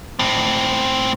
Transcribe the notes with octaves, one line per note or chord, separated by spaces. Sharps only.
A2 C4